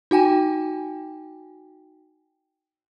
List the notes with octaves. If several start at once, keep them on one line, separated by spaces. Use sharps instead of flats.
D#4 F#4 G5 G#5